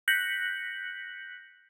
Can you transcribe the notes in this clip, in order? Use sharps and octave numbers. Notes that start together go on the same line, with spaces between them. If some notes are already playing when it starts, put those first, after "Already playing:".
F#6 G6 A#6 B6 C#7 F#7